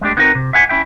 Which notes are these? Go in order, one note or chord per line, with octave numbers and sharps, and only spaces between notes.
G#3 A3 D4 G4
B3 C4 D#4 F#4 A#4 B4
C3
E5 F#5 G#5
C#4 E4 E5 G5